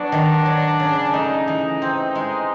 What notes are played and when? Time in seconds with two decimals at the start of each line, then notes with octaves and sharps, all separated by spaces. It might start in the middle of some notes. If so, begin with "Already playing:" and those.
Already playing: F#3 B3 D4
0.12 D#3
0.46 F#3
0.80 C#3
1.14 A3 D#4
1.48 E3
1.82 C4
2.15 G#3